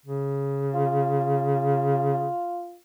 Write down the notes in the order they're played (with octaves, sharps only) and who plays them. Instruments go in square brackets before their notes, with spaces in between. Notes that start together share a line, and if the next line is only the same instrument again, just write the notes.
[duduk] C#3
[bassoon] F4